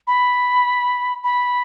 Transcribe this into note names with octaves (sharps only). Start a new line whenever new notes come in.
B5
B5